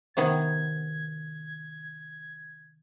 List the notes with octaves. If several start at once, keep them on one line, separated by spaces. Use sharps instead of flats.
C3 D#3 B3 G#6